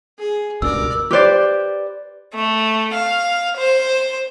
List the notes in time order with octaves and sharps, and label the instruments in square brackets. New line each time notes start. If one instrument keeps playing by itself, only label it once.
[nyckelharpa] G#4
[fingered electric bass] C#2 G2 B2 [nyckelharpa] A#4 D5 [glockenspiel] E6
[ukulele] G4 B4 C5 D5
[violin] A3
F5
C5